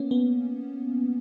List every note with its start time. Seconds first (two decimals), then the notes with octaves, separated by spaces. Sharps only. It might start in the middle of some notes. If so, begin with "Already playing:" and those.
Already playing: A#3 B3 C#4
0.11 B3